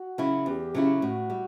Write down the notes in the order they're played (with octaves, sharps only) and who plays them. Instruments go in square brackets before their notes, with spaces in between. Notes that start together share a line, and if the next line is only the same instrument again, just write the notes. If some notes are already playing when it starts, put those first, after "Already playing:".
Already playing: [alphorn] F#4
[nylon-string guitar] C#3 F#3 C#4 E4
[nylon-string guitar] E2 [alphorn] G4
[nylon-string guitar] C#3 F#3 C#4 E4
[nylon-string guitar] A2 [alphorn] F#4
[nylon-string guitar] G3